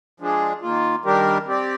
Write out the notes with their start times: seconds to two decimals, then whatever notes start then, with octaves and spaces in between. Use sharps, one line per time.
0.20 F3 G#3 D4 G#4
0.62 D#3 A#3 F4
1.05 D#3 G3 D4 G4 A#4
1.47 C4 G4 D5